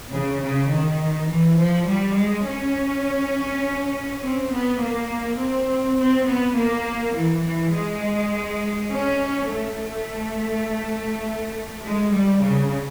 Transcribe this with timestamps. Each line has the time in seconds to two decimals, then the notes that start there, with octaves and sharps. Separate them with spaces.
0.12 C#3
0.42 C#3
0.71 D#3
1.30 E3
1.58 F3
1.89 G3
2.18 G#3
2.46 C#4
4.22 C4
4.52 B3
4.81 A#3
5.39 C4
5.99 C4
6.27 B3
6.57 A#3
7.15 E3
7.45 E3
7.73 G#3
8.91 C#4
9.50 A3
11.84 G#3
12.13 G3
12.42 C#3